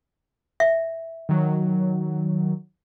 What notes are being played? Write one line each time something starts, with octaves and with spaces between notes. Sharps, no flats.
E5
D#3 F#3